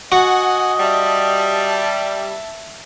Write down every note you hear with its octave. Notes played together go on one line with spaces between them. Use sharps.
F#4 D#5 F#5 G#5
G3 E5 A5